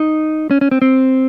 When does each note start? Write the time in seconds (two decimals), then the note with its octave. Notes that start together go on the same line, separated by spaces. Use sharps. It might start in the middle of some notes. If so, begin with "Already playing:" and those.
Already playing: D#4
0.51 C#4
0.61 C#4
0.71 C4
0.82 C4